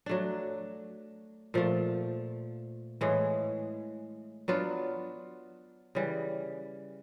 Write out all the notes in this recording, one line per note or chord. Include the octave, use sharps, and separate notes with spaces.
F#3 A3 D4
A#2 F3 A3
A2 E3 G#3
F#3 B3 D4 F4
C#3 E3 G3